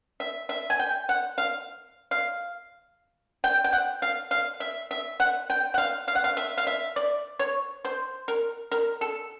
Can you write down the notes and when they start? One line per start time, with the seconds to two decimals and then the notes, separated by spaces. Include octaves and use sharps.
0.20 E5
0.49 E5
0.70 G#5
0.79 G5
1.09 F#5
1.38 F5
2.11 F5
3.44 G5
3.64 G5
3.73 F#5
4.02 F5
4.31 F5
4.60 E5
4.91 E5
5.20 F#5
5.50 G5
5.74 F#5
5.78 F5
6.08 F5
6.15 F#5
6.24 F5
6.37 E5
6.58 F5
6.67 E5
6.96 D5
7.39 C#5
7.85 C5
8.28 A#4
8.71 A#4
9.01 A4